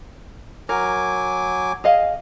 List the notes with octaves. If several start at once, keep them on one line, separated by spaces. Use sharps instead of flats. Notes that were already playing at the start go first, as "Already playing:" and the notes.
F#3 A#4 G#5 D6
G#4 D#5 F5